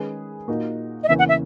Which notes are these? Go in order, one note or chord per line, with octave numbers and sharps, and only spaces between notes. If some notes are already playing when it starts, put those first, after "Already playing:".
Already playing: D#3 G#3 C#4 G#4 B4
A#2 A#3 D#4 F#4
D#5
E2 C#3 E3 A#3 C#4 E5
F#5
E5